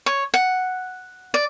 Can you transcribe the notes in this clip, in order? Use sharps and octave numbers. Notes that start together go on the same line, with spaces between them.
C#5
F#5
D5